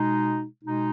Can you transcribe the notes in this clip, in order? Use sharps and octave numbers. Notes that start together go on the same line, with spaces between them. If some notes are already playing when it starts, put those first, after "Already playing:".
Already playing: B2 G#3 D#4
B2 G#3 D#4